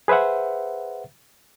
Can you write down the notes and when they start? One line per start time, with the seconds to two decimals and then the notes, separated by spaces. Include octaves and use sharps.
0.08 G#4 B4 C5 E5 F#5